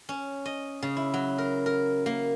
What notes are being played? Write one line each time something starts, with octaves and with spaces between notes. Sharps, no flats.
C#4
D#5
C#3
E4
F#3
A#4
A#4
A#3